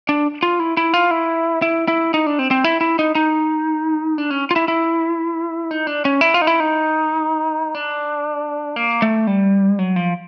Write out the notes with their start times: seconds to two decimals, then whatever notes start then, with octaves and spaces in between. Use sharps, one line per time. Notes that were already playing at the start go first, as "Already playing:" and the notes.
0.09 D4
0.43 F4
0.59 E4
0.77 E4
0.94 F4
1.11 E4
1.62 E4
1.88 E4
2.14 D#4
2.26 D4
2.39 C4
2.51 C4
2.64 E4
2.81 E4
2.99 D#4
3.15 D#4
4.18 D4
4.31 C#4
4.51 F4
4.56 E4
4.68 E4
5.71 D#4
5.87 D4
6.05 C#4
6.21 E4
6.34 F4
6.41 D#4
6.47 E4
6.60 D#4
7.75 D4
8.76 A#3
9.02 A3
9.27 G3
9.79 F#3
9.96 F3